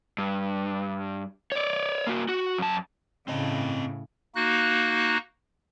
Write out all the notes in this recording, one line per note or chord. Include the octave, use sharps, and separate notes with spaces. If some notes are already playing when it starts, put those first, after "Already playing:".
G2
C#5 D5
A#3 F#4
F#4
F#2 A5
A2 C#3 C4 D#5
A#3 D#4 F#4 F#6